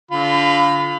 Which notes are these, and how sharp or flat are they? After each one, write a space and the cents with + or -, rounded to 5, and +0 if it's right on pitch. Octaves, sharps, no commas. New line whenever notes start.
D3 -30 F4 +0 B5 +25